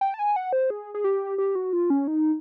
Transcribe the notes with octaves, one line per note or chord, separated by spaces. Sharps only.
G5
A5
G#5
F#5
C5
G#4
G#4
G4
G4
F#4
F4
C#4
D#4